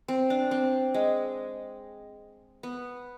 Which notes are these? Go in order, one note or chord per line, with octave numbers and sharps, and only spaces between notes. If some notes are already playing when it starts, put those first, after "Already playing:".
C4
D4
C4
G#3
B3